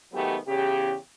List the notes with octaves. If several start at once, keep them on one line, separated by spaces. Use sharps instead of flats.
G#2 D#3 F#3 A3 B3 G4
E2 C#3 G4